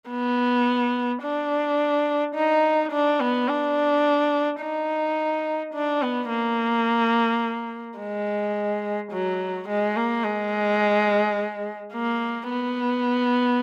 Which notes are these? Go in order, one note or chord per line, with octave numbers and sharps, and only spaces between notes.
B3
D4
D#4
D4
B3
D4
D#4
D4
B3
A#3
G#3
F#3
G#3
A#3
G#3
A#3
B3